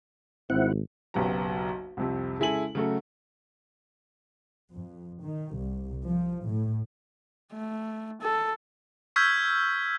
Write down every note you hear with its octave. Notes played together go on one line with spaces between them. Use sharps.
G#1 C4 E4 F#5
F#1 B1 F#3 B3 G4 A#5
C2 F2 C3
C#3 G#3 E4 A4 G#5 F#7
C#3 F#3 A3 F#4 A4
F2
D#3
C2
F3
A2
A3
A4
C#6 E6 F6 G6 G#6 B6